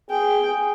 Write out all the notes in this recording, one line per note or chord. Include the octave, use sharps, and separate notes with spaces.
G#4 G5